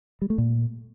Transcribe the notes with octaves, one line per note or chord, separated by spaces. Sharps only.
G3
A3
A#2